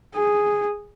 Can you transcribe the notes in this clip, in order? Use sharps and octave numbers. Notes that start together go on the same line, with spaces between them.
G#4